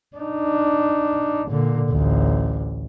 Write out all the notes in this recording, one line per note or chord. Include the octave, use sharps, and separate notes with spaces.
D4 D#4
A#2 D3
A1 D2